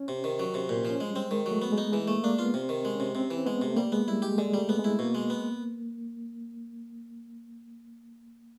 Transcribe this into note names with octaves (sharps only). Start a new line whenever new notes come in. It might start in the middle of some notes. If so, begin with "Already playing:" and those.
Already playing: C#4
C3
D#3
F#3
C3
A#2
F3
C#4
G#3
G3 C4
D#3 G#3
F#3
A3
B3
G#3
D#4
E3 G#3
A3 A#3
A#3 D4
B3 F4
C3 C4
D#3
G#3
C3 C#4
C3 C4
E3
G#3 B3
C3
A3
G3 A#3
G#3 B3
G3 E4
G#3 G4
D3 G#3
G3 A3
B3
G#3
E4
B2 A#3
G#3
B3